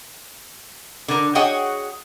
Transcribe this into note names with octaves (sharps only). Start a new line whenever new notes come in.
D3 A#4
F#4 G#4 C#5 D#5 F#5 G5